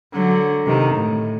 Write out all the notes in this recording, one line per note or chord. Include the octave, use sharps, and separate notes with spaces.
D3 F#3
C3 D#3
A2